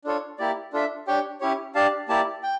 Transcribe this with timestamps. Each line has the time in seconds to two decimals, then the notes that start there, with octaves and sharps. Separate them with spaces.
0.05 D4 F4 A4 C#5
0.38 A#3 E4 G4 D5
0.73 D4 F4 A4 E5
1.07 D4 G4 C#5 G5
1.41 C#4 E4 G4 C#5
1.75 D4 G4 D5 F5 A5
2.09 A#3 E4 G4 D5 A5
2.43 G5